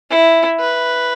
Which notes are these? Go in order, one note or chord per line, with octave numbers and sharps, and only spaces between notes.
E4
B4